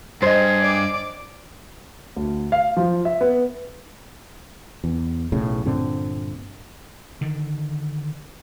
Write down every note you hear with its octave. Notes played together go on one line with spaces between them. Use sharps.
G2 G#4 C5 D#5
D5 D6
D2
F5
F3
E5
B3
E2
B1 A2 C#3
G2 A#2 D3 C4
D3 D#3